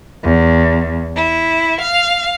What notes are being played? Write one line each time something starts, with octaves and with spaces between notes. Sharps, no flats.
E2
E4
F5